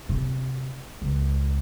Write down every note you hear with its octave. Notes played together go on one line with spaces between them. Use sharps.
C3
C#2